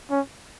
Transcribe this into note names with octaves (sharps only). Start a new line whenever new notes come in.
C#4